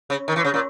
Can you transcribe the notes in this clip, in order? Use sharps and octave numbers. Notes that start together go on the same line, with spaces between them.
C#3
D#3
E3
C#3
A#2